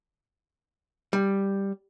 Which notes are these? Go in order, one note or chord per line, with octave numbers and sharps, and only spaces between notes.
G3